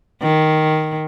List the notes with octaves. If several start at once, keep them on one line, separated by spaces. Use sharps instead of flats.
D#3